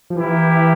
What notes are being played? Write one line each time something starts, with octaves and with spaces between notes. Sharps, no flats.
F3
E3 A#3 E4 G4